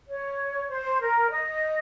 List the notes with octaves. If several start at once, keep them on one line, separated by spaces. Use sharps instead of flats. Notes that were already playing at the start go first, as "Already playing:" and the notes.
C#5
C5
A#4
D#5